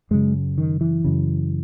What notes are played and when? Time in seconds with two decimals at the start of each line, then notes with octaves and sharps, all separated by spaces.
0.11 F#2 C#3 G#3
0.58 D#3
0.81 E3
1.04 F#2 C#3